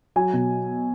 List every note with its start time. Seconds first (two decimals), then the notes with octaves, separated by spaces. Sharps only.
0.16 F#3 G#5
0.33 B2